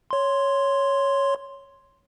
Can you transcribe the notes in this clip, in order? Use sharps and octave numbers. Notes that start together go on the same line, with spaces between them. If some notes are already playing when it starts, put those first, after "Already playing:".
C#5 C6